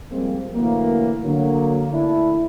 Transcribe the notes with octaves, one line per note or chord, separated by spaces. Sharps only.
F3 G3 G#3 A#3 C4
A2 D3 E3 F#3 A#3
D3 F#3 A#3
A2 D3 A3 D4 E4